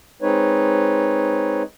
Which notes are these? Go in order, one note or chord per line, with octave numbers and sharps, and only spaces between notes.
G#3 C4 D#4 B4 C#5